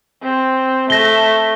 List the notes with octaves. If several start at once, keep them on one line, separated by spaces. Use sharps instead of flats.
C4
A3 A#6 G7